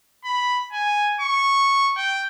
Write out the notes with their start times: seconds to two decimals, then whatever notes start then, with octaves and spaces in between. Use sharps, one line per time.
0.24 B5
0.72 G#5
1.21 C#6
1.96 G5